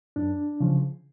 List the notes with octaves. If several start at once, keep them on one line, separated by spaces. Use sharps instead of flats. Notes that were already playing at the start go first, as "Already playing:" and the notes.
F#2 D4
C#3 F3